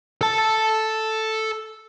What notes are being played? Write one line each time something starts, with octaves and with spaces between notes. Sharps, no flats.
A4 A5